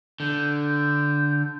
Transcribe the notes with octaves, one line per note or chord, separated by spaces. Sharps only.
D3 G6
G6